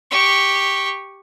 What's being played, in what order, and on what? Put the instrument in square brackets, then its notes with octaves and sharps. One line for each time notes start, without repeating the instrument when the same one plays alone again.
[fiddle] G4 C#6